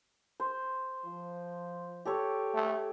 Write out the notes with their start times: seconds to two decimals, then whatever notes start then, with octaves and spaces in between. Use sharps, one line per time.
0.40 C5
1.05 F3
2.05 G4 A4 C#5
2.54 A3